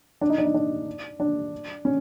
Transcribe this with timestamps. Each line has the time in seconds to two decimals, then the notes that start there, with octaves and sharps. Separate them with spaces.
0.21 D4
0.30 D#4
0.38 D4
0.45 D#4
0.54 D4
1.20 D4
1.85 C#4